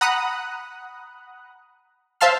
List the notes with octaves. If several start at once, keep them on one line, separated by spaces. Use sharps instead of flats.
F#5 A#5 B5 D#6 F#6
C5 E5 F5 A5 C6 F6